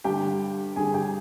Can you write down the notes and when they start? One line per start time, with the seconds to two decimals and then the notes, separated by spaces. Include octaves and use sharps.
0.04 G2 D3 G4 G5
0.76 G2 D3 G#4 G#5
0.94 G4 G5